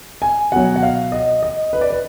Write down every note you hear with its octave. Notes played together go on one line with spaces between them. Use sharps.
G#5
B2 F#3 F#5
F#5
F5
D#5
D#5
B4
D5
B4